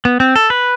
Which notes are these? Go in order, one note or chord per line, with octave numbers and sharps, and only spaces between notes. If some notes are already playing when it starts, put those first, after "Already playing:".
B3
C4
A4
B4